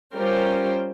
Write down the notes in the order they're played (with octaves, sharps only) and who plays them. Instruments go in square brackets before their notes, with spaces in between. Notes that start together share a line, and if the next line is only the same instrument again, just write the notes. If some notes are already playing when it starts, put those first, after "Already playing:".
[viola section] G3 C#4 F4 A#4 C5 G5